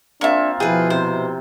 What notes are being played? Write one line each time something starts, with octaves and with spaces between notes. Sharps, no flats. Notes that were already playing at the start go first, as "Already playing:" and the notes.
A#3 C4 D4 F4 E5 C#6
B2 F3 E4 G#4 B4 G5
C3 C5